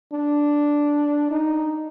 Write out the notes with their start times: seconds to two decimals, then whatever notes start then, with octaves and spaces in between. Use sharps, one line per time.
0.13 D4
1.31 D#4